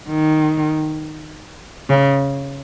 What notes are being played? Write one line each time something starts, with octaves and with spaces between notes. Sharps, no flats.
D#3
C#3